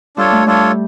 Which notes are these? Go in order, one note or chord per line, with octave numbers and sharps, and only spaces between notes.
G3 D4 F4 A4 C#5
A3
G3 D4 F4 A4 C#5